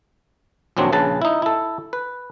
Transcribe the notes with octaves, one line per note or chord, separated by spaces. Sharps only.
A#1 D#2 F#3 C4 D4
A#1 C#3 B4 A5
D#4 E4
E4 A4
B4